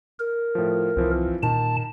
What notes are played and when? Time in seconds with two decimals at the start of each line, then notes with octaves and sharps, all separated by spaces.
0.19 A#4
0.55 A2 F3
0.97 C2 E3 F3 C4
1.43 A#2 D#3 A5